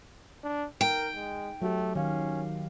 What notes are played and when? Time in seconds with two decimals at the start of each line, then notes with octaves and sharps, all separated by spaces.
0.44 D4
0.81 D#4 A#4 G5
1.15 G#3
1.62 F#3 A3 F#4 G4
1.95 D#3 C#4 F5